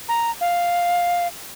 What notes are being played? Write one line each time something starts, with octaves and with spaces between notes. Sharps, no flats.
A#5
F5